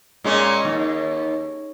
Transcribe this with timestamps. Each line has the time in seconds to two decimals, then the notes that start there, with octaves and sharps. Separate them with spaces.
0.24 A#2 G#3 C#4
0.65 D#2